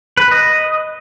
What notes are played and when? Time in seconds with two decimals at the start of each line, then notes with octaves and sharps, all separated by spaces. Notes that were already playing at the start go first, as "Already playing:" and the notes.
0.17 B4
0.31 D#5